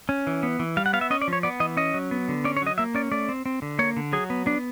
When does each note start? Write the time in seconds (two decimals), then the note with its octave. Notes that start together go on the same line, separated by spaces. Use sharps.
0.09 C#4
0.27 E3
0.43 B3
0.59 E3
0.77 G3 F5
0.86 F#5
0.93 B3 F5
1.01 E5
1.10 C#4 D#5
1.22 D5
1.28 F3 C#5
1.43 B3 D5
1.60 E3 D#5
1.77 C#4 D#5
1.94 F#3
2.11 B3
2.29 D3
2.44 C#4 D5
2.57 C#5
2.62 F#3 D#5
2.78 A#3 E5
2.95 C#4 D5
3.12 A3 D5
3.29 C4
3.46 C4
3.62 D3
3.79 A#3 C#5
3.97 D3
4.13 F#3 G#4
4.30 B3
4.46 B3 D4